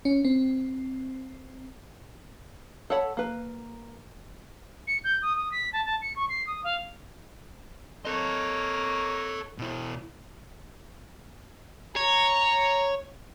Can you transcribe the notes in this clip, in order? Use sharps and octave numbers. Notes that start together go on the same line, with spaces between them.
C#4
C4
A4 C#5 F#5 B5
A#3 B4
C#7
G6
D#6
D#6
B6
A5
A5
C#7
C#6
C7
D#6
F5
A#3 A4 C#5 D#5
B2 E4
C#5 A#5